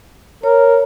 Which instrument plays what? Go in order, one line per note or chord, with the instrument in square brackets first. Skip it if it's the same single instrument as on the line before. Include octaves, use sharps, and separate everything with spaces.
[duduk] A#4 [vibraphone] C#5